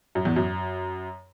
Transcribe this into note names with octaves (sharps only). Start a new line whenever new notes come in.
F#2
E2
F#2